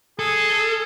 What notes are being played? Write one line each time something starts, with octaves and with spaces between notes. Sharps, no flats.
G#4 A4